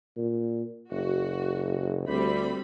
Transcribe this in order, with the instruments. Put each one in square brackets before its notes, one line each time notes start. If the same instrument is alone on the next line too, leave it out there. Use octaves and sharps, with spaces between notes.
[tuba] A#2
[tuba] F#1 [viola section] F#4
[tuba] D2 [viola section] G3 C4 B5